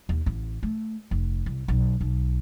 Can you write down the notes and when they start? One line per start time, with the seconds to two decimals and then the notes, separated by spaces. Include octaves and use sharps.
0.09 D#2
0.26 A1
0.63 A3
1.11 F1
1.46 C2
1.68 B1
2.01 B1